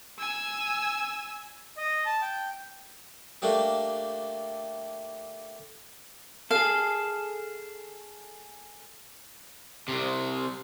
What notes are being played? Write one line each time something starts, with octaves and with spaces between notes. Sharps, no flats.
G#5 E6
D#5
A5
G5
A3 A#3 D4 G4 A4
G#4 A4 F5
C2 C3